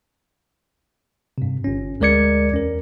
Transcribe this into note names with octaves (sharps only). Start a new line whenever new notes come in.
G2 C3
G1 C#4
D2 G#3 A#4 D5 G#6 C#7
E2 C#4 A#4